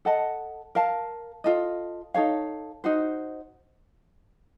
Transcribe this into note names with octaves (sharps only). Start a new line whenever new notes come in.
A4 D#5 F#5 A5
A#4 F5 A5
F4 A4 D#5
D#4 A4 C#5 F5
D#4 F#4 C5